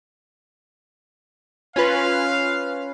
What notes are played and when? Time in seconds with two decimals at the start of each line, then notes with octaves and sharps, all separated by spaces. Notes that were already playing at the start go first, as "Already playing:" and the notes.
1.76 C#4 F4 B4 F5